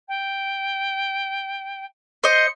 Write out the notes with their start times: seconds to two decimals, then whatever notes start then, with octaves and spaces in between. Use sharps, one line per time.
0.08 G5
2.24 C5 D#5 C#7